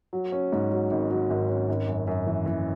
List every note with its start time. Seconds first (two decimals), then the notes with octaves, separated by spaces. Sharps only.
0.13 F#3
0.32 C#4
0.52 G#2
0.71 F#3
0.91 G#1
1.11 F#3
1.30 G#1
1.49 C#4
1.69 G#1
1.88 F#2
2.07 F#2
2.27 E3
2.46 E3